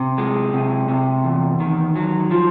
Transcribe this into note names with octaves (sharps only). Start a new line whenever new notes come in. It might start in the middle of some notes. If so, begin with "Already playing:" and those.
Already playing: C3
G#3
C3
C3
E2
D#3
F#3
F3